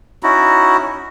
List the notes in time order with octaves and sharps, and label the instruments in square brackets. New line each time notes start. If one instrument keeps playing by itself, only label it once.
[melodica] C#4 D#4 E4 F#4